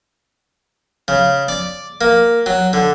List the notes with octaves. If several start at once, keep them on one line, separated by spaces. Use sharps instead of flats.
C#3
D5
A#3
F#3
D3